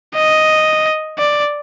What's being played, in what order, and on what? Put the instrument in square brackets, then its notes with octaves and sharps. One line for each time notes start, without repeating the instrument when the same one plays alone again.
[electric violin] D#5
D5